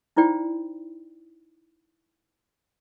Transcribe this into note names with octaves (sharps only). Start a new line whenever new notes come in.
D#4 E4 C5 D5 G5 B5